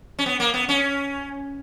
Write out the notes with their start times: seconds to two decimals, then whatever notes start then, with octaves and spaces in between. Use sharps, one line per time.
0.19 C#4
0.26 B3
0.40 A#3
0.54 B3
0.69 C#4